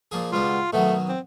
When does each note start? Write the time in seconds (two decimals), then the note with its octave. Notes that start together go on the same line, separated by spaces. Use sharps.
0.11 A#2 F3 G#4
0.32 C#2 B2 G3 F4
0.73 B2 D#3 F#3 A3
1.08 C4